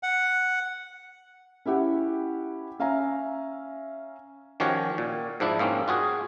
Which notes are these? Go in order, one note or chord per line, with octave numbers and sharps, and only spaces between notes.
F#5
C#4 E4 G4 F#5
C#4 E5 F5 G#5 A#5
D#3 F3 C#4 F#4 G4 C#5
A#2
G#2 F3 D4 E4
G#2 A#3 C4 C#4
F4 F#4 G#4